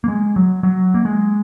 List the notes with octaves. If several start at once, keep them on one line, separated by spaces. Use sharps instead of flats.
A#3
G#3
F#3
F#3
A#3
G#3